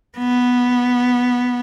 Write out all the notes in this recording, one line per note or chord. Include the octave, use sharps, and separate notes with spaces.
B3